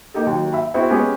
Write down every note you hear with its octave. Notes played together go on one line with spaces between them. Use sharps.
A#3 D#4 G4 A4
D#2 F#3
E5 B5
B3 C4 E4 F#4 G#4
G#3 B3 C#4 G4 G#4 B4